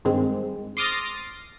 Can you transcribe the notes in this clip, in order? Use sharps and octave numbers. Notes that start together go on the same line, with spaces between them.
G2 D#3 G#3 C4
C6 D6 D#6 F6 A6 A#6